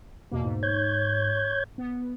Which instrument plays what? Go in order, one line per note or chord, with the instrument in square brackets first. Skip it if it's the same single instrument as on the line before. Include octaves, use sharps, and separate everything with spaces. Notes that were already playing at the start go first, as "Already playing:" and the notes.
[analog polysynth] E2 B2 A#3
G#2
[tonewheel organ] C#5 G6 G#6
[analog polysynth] B3